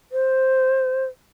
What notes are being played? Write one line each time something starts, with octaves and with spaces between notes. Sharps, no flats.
C5